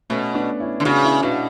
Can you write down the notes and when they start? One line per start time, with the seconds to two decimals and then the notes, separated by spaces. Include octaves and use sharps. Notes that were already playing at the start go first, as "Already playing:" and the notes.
0.10 B2 A3 C#4
0.34 B3 D4
0.60 C#4 E4
0.80 D3
0.85 C#3 D4 F#4
1.03 C#4 E4
1.22 B2 D4 F#4